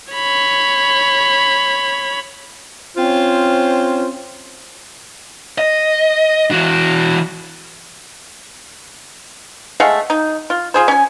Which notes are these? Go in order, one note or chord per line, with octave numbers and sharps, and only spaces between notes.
C#5 B5
C4 C#4 F4 C5
D#5
E3 F#4
G#3 A3 F5 F#5
D#4
F4
F4 G#4 C5
C#4 G#5